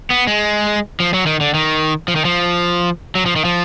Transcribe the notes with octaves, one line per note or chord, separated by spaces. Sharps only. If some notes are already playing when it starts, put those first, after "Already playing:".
B3
G#3
F3
F#3
D#3
D3
D#3
F3
D#3
F3
F#3
F3
D#3
F3